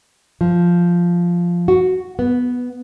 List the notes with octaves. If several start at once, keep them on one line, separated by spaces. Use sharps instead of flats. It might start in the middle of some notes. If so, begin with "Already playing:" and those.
F3
F#4
B3